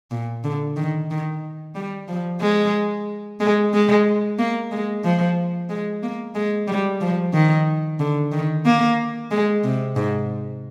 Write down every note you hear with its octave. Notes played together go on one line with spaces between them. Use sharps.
A#2
D3
D#3
D#3
G3
F3
G#3
G#3
G#3
A#3
G#3
F3
G#3
A#3
G#3
G3
F3
D#3
D3
D#3
A#3
G#3
C3
G#2